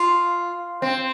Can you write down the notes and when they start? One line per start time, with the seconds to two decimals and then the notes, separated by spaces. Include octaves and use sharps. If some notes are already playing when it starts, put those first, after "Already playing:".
Already playing: F4
0.82 C4